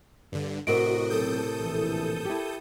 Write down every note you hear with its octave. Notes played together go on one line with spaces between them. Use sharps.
G2 D3
A2 C3 F#4 A#4 D#5 D7
B1 C4 G4 A4 D#6 G6
A#1 E3
E4 G4